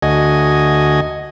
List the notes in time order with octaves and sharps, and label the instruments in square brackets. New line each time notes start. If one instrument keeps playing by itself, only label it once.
[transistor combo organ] D2 F#4 D#5 G#5